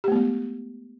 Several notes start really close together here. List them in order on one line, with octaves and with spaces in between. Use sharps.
G4 A3 B3 G#3